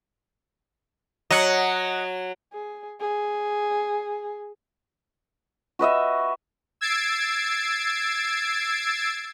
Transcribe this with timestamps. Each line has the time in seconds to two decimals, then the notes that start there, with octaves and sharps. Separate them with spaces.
1.30 F#3 D#5 F#5
2.53 G#4
3.00 G#4
5.79 F#4 B4 D#5 E5
6.81 E6 G#6 A6 C7 D7